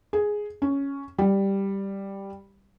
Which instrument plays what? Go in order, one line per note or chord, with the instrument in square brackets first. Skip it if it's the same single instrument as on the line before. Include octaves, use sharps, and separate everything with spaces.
[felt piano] G#4
C#4
G3